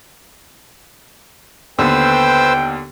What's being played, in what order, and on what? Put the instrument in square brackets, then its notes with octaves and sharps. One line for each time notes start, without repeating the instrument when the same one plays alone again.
[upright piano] D#2 D3 B3 [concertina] B4 C5 E6 [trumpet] G5